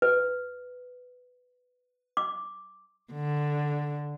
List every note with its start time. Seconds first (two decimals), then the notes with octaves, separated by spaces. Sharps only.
0.02 B4
2.17 D6
3.12 D3